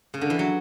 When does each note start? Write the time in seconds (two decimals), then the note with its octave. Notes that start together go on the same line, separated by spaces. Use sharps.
0.14 C#3
0.21 D3
0.30 E3
0.39 F#3